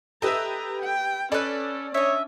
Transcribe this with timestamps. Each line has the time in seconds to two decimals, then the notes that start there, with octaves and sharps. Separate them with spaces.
0.22 G4 A4 B4 D#5 E5 A#5
0.82 G5
1.32 C#4 A4 B4 D5
1.94 C#4 D4 C#5 D#5 E5